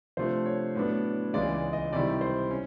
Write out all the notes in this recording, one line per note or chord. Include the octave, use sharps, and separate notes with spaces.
C3 F3 A3 D4 C5
C#5
A2 F#3 B3 D4
C#2 C#3 E3 G#3 D5
D5
D#5
C3 D#3 G3 C4 E4 D5
C5
C#4